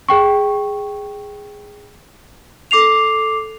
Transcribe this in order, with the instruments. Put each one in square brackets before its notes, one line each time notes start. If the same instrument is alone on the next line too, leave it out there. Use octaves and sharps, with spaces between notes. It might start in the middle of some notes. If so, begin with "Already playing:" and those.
[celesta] G#4 G5 C#6
A4 D6 C7 F7